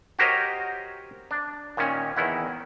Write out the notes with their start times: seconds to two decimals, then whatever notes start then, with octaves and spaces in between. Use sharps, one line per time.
0.19 F#4 G4 A#4 C5 C#5 D#5
1.31 D4
1.77 A#2 D#3 C#4
2.16 E2 D#3 E4 F#5